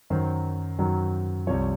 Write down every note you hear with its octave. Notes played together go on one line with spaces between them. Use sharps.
F#2 D#3 F#3 C5
F#2 D#3 F#3
C2 C3 F3 C#5